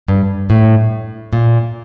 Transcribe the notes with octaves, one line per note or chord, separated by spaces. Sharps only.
G2
A2
A#2